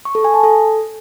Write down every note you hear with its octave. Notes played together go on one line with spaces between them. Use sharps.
C#6
A4
G#5
A5
A4